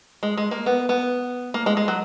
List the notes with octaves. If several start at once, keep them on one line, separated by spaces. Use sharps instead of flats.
G#3
G#3
A#3
B3
B3
A#3
G#3
G#3
F#3